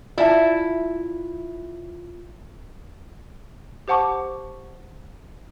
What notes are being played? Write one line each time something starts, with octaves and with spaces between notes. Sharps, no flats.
E4 F4 D5 E5 A5
G4 C5 F#5 A5 C#6 D6